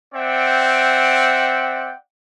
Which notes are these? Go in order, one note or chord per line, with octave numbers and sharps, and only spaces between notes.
C4 D5 E5 F#5 G5